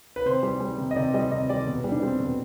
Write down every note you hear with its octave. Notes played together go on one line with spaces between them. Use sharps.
B4
C3 C5
G3
G3
C3
D#5
C3 D5
G3 D#5
C3 D#5
G3 D5
B2
G3
D4
G3 C4
B2